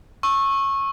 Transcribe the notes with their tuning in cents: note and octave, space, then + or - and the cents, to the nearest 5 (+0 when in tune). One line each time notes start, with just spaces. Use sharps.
C#6 -20 E6 +0